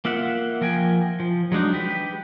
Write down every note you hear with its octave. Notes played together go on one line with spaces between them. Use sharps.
A#3 F4 E5 F#5
F3 A#4 G5 G#5
F3
F#3 G#3 D4 D#4
G4 B4